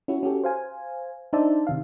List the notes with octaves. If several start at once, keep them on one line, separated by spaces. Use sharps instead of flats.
C#4 E4 F#4
C#4 F#4 G4 A4
C5 F5 G#5
D4 D#4 C5 D5 E5 A5
C3 D#3 F5